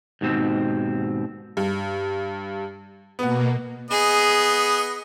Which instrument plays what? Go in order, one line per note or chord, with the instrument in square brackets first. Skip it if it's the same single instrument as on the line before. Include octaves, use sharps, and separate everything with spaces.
[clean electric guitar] D#2 G#2 B2 C4
[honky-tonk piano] G2
[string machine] B2 A#3 [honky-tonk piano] B3 F#5
[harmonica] B3 D#5 [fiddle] G#4